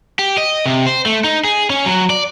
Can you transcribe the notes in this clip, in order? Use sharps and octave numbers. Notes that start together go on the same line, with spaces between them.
G4
D#5
C3
C5
A3
D#4
G#4
C#4
F#3
D5